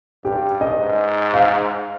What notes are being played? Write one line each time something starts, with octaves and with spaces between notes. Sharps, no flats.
G2 G4
D#5
G#2
F5